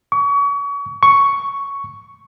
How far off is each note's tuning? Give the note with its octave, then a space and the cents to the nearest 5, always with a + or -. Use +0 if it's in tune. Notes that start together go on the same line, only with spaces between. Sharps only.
C#6 +35
C#6 +5